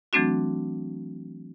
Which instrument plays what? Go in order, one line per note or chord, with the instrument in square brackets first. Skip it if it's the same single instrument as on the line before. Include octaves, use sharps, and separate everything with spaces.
[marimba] E3 F#3 A3 C4 D4 F#4